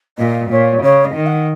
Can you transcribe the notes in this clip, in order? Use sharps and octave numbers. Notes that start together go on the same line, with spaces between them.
A#2 D#5
A#2 C#5
C#3 C#5
D#5
D#3
F#5